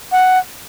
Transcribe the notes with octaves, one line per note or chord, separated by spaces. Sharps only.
F#5